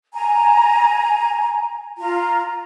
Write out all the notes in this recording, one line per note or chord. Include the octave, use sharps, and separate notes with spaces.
G#5 A#5
F4 A#5